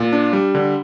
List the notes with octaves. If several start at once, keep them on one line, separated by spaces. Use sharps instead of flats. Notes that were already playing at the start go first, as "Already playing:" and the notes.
Already playing: A#2
D4
G3
D3